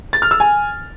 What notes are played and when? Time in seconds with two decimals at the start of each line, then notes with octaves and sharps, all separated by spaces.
0.13 A6
0.22 F6
0.31 E6
0.40 G#5